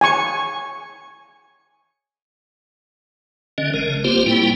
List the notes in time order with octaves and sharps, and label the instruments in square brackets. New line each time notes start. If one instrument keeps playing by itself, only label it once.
[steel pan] G#5 C#6
[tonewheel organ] D3 C#4 D#5
A1 C#3 G#3 A#4
F#1 A#3 C4 F4 G4 C5
A2 G3 A#3 E4 G5